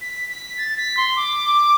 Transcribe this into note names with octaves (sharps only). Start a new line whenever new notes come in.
B6
B6
A6
B6
C6
D6